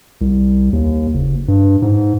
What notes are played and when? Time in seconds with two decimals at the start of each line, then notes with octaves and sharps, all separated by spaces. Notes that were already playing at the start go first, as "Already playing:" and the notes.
0.21 C2
0.73 D#2
1.14 F#1
1.48 G2
1.82 G#2